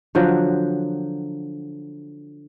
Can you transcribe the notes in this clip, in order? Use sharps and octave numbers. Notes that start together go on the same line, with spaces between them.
D3 F3 F#3